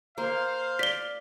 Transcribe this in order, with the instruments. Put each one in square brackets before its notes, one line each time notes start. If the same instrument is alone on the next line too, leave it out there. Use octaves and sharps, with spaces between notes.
[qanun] A#3 [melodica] C5 [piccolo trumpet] F5
[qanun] D5 [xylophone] B6 G7